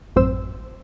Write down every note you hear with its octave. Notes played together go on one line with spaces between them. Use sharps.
A1 F#2 C4 C5 E6